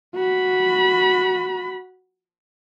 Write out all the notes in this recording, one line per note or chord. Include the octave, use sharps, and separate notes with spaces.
F#4 B5